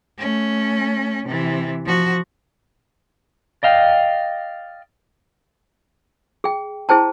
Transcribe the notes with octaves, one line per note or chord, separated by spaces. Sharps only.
A3 C#4
C3 E3
F3 F#4
D5 D#5 F5 G5
G#4 G5
E4 G#4 C5 G5 A5